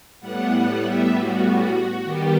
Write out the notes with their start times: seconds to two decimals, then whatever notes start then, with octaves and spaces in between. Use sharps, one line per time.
0.20 A2 G3 B3 F#5
0.51 F#5
0.81 E5
1.12 F#4
2.03 D#3 G3 B3 G4